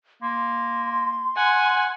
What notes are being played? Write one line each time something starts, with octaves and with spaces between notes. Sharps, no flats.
A#3 C6
F#5 G#5